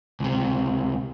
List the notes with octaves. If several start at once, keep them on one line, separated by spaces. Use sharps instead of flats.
C#2 C3